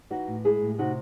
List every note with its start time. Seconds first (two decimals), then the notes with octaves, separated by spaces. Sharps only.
0.10 E3 D#4 F#4
0.28 A2
0.44 G#3 E4 G#4
0.61 A2
0.78 C3 D#4 F#4